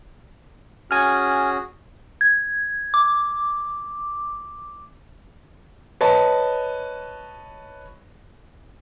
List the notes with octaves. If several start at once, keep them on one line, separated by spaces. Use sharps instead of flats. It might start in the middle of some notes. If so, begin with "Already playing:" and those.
C#4 F#4 G#4 G#5 F6
G#6
D6
B4 C#5 D#5 A5